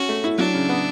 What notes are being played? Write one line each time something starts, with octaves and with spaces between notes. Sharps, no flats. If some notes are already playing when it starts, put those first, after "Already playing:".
Already playing: C#4 F#4
A3
E4
F#3 D4
C#3
B3